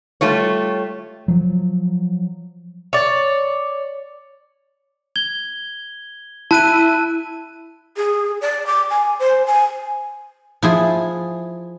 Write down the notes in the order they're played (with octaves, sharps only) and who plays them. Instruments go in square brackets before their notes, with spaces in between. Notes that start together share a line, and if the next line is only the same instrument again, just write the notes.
[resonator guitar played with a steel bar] G3 A3 F4 C#5
[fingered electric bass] F3 F#3
[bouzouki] C#5 D5
[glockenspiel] G#6 G7
[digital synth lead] E4 [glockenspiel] A5 F#6 D#7
[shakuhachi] G#4
D5
D6
G#5
C5
G#5
[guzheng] F3 E4 G#4